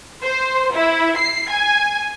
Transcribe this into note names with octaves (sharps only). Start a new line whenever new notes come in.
C5
E4
C7
G#5